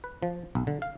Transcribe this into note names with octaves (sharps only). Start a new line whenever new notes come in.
B4
F3
B1
D3
F5